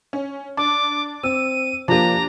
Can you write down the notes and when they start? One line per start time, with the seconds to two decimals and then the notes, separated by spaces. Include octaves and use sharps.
0.13 C#4
0.57 D4 D6
1.23 C4 E6 D#7
1.88 F3 A#3 D4 G4 A#5